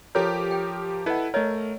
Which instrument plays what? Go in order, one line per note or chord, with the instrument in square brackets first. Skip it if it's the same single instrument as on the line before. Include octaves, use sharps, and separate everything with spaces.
[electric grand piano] F3 G4 A#4 [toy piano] A4 C#5
[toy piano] G5
[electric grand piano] E4 A4 B4 [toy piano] D#5 F#5
[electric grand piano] A3 A#4 [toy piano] C#5 D#5